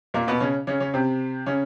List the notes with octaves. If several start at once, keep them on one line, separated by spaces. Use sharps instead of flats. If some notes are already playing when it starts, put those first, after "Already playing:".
A#2 A#3
B2 B3
C#3 C#4
C#3 C#4
C#3 C#4
C3 C4
C#3 C#4